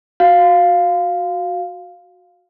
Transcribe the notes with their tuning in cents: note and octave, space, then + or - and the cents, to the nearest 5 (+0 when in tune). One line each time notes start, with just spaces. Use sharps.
F#4 -15 F5 +0